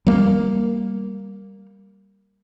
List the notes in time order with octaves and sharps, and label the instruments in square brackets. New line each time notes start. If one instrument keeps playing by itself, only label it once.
[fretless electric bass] G3 A#3